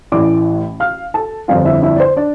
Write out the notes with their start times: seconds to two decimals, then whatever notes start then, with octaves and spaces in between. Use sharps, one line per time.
0.12 A1 A2 E3 D5 D6
0.80 F5 F6
1.14 A4 A5
1.48 G1 F2 D3 F3 F4 F5
1.65 E4 E5
1.83 E4 E5
1.96 D5
2.00 C5
2.16 D4 D5